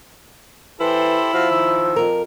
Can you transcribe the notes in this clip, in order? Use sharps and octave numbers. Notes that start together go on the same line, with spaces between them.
E3 E4 G4 A4 C5
F3 F4 F#4 F5
D#3 E6
F2 A#4